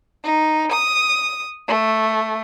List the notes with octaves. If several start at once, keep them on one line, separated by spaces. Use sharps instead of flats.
D#4
D#6
A3